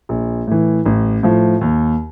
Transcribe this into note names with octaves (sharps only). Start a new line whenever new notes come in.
A#1
A2 E3
A1
A2 F3
D#2